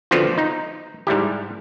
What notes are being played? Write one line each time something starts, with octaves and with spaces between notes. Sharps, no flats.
D3 F3 B3 C4 F4 F#4
D#4
G#2 G3 E4 G4